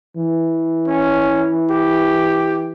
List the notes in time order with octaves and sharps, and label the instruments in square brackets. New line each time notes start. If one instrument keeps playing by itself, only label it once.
[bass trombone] E3
[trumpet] C#4
G4